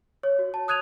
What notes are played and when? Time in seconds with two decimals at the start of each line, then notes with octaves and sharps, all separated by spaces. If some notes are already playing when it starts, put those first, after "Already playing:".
0.23 C#5
0.39 F#4
0.54 A5
0.68 D#6 F#6 G#6 D#7 F7